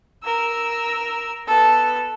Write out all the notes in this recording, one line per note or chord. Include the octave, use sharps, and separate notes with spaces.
A#4 E6
B3 A4